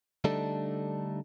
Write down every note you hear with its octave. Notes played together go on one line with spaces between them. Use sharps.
D3 G3 A3 D4 D#4 A4